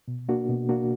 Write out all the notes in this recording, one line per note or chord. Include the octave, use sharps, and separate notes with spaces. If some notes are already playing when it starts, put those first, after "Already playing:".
B2
A#3 D4 F#4
B2
A#3 D4 F#4